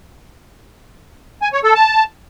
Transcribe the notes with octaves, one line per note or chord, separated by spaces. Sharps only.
G#5
C#5
A4
A5